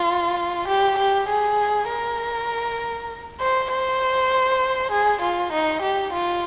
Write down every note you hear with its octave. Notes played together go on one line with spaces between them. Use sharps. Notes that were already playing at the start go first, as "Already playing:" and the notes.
Already playing: F4
G4
G4
G#4
A#4
C5
C5
G#4
F4
D#4
G4
F4